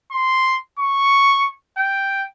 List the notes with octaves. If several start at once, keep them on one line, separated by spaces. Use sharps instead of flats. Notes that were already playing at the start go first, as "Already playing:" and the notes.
C6
C#6
G5